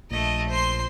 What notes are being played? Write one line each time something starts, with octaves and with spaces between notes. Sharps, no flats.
A#1 A3 D#5
C5 C6